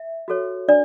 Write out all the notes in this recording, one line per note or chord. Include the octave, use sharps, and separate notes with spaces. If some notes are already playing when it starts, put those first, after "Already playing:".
Already playing: E5
F#4 A4 C#5
D4 D5